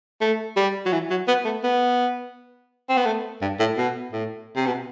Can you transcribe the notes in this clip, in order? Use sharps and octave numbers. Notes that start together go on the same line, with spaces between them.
A3
G3
F#3
E3
F#3
B3
A3
B3
C4
B3
A3
G2
A2
B2
A2
C3
B2